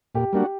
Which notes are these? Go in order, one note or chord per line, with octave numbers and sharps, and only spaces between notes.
A#2 G4
G3 A#3 D4 F#4